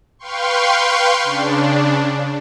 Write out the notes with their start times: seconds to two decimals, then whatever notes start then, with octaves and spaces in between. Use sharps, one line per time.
0.19 B4 F5 G5 C6 C#6
1.23 C#3 D4